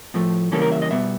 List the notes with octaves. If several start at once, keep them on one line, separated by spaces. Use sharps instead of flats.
A2 F3 A3
C#3 E3 G3 A#3 C#4 A4
A#4
E5
D#5
B2 G3 B3 E5